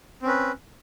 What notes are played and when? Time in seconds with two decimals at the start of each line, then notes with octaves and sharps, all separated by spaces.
0.23 C4
0.25 C#4
0.28 B4